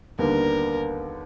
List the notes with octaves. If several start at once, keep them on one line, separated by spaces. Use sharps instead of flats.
D#2 D3 G3 B3 A#4